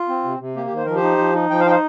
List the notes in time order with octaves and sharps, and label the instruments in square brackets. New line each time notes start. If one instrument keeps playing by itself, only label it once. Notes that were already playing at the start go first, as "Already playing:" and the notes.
Already playing: [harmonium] F4
C4
C3
C3
A#3 G4
G4
D#3
C5
F3 A#4
G4 C5
D#4
F3
D#4
F3 G5
C5 F5
D#4 G5
C5 F5